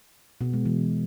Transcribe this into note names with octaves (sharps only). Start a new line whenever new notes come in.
B2 B3
G#3
E3